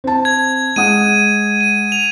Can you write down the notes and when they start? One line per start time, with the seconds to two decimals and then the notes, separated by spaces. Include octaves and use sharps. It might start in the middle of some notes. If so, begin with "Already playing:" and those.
0.04 C4 A5
0.25 G#6
0.76 G#3 F#5 D#6 D#7
1.61 D#7
1.92 F7